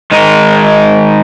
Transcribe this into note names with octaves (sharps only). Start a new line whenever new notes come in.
D#3 G#3 D#4